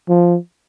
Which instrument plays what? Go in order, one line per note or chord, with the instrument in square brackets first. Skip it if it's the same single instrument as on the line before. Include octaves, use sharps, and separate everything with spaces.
[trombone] F3